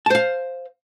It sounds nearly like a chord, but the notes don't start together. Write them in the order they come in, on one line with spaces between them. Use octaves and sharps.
A5 C5 F5